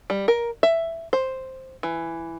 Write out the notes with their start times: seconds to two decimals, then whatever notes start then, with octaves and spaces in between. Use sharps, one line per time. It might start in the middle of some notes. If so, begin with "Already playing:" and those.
0.10 G3
0.28 A#4
0.63 E5
1.13 C5
1.83 E3